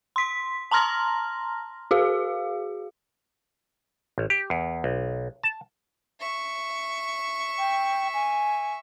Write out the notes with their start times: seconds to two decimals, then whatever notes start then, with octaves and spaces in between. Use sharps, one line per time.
0.16 C6 B6
0.71 A5 A#5 C6 F6 A#6
1.91 F#4 G#4 F5
4.18 A1
4.30 G4
4.50 E2
4.84 B1
5.43 A5
6.20 E5 C#6
7.59 G5
8.14 G#5